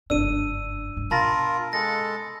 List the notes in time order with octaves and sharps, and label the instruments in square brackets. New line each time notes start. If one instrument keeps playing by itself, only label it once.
[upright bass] F#1 G2 [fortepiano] D4 [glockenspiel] E6 D#7
[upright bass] G#2
[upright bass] B2 [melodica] F4 A#4 [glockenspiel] A5 B5 A#6
[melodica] G#3 A4 [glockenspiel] A#6